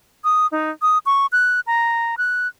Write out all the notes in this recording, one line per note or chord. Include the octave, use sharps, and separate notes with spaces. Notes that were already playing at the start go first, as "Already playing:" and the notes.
D#6
D#4
D#6
C#6
F#6
A#5
F#6